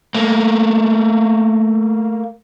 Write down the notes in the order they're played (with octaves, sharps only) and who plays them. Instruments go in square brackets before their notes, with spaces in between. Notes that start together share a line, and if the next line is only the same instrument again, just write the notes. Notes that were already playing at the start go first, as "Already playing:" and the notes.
[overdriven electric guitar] A3 A#3